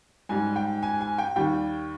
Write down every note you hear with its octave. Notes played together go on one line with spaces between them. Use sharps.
G#2 G3 G#5
G5
G#5
G#5
G5
D#2 D#3 G3 G5